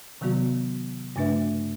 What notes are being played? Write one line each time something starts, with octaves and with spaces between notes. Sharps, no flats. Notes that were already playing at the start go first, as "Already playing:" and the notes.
C3 D#3 F#3 B3 F#4
G2 C#3 A3 D4 B4 E5